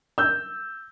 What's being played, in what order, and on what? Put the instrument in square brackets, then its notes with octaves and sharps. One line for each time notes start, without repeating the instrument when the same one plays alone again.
[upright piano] E6 G6